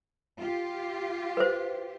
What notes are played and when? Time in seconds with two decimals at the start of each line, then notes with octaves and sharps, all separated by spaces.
0.39 F4 G4
1.37 B4 C5